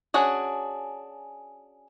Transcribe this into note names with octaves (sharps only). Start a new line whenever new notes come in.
C#4 D4 F#4 G#4